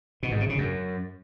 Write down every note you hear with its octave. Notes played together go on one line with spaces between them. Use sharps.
B2
G#2
C3
C#3
F#2